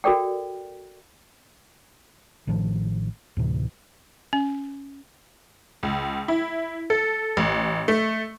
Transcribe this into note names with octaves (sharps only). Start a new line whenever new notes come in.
F#4 A4 A#4 D5 G5
A1 A2 D#3 F3
D2 A2 C3 E3
C#4
C#2
E4
A4
A1
A3